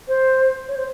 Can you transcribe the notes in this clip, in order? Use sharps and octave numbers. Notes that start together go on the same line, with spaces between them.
C5
C#5
C5